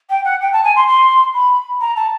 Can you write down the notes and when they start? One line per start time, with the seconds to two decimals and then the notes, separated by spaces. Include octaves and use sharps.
0.10 G5
0.25 F#5
0.41 G5
0.53 A5
0.64 G#5
0.76 C6
0.88 C6
1.34 B5
1.81 A#5
1.96 A5